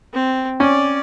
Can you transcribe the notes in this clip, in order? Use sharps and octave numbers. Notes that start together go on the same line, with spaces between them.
C4
C#4 D5